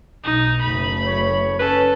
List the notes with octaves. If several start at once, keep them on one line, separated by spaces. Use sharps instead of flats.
B1 D#4
F#1 A3 B5
C#5
C#4 A4 B4